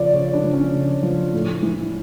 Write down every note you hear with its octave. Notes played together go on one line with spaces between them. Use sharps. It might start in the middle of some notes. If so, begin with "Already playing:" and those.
Already playing: C#3 F3 D5
C#3 C#5
D4
F3
C#4
C#3
F3
A2
E3